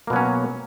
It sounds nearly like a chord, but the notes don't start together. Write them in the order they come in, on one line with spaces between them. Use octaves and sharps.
A#3 B2 F#3 C#4